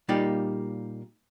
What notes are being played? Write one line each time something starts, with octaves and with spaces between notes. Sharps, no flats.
A#2 G3 A#3 D#4 G4 D5